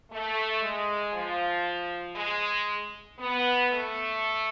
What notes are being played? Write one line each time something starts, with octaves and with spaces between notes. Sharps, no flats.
A3
G#3
F3
G#3
B3
A3